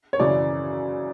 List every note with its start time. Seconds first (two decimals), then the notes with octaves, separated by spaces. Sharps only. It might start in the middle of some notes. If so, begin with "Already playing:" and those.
0.13 C#5
0.19 F#2 C#3 E3 D5